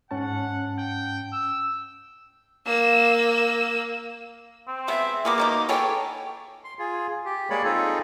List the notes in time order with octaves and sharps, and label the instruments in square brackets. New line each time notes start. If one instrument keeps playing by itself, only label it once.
[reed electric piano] G#2 C#4 A5 [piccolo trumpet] F#5
[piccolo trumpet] G5
E6
[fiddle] A#3 E6
[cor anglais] C4
[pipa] G#3 B3 [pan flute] E5
[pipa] G#3 B3 G#4 [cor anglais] A#3 [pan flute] D6
[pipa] B2 D#3 D#4
[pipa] B3 G#4 C#5 [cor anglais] A4 [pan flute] G5
[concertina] C6
F4 G#4
G4
G#3 A#3 G#4 C#5 D5 B5
C4 D#4 F4 G#4 A4